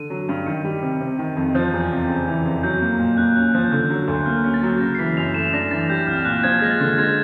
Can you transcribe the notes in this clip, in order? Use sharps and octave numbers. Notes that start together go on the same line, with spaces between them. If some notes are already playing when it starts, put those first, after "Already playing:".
Already playing: D3 D#7
F#3
G2
D#3 C#7
G3
C3
C3
D#3
F2
F3 G6
E2
C3
C#3
E3
F2
F#3 G6
A#3
A#2
A#3 F#6
C#4 F#6
F3 G6
G6
D3 F#6
F#3
D2
A#3 F6
C#4
A6
F#3
C#3 A#6
C7
E3 B6
F#2 F7
A3 E7
D4 A#6
E3 A6
G3 G6
C2 F6
A#2 F#6
F3 G#6
G#3 A#6
A6
D3
G#3 G#6